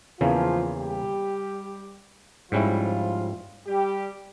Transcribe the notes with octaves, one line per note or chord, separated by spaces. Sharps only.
E2 C#3 E3 F3 A#3 C#4 F4
G3 G4
G#2 F3 G3 C#4 E4 F4
G3 G4